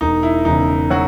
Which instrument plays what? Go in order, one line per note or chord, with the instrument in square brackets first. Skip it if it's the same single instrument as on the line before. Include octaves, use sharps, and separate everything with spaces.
[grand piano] E1 [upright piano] D#4
[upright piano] E4
[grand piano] E2 C#3 [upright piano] D#4
[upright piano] F#3 F#4